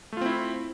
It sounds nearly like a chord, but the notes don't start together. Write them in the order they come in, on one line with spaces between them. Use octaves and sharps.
A3 F4 C4 E4